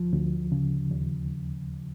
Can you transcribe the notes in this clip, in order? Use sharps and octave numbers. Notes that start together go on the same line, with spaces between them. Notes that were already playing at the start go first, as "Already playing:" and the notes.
Already playing: D2 F3
D2
C#3
D#2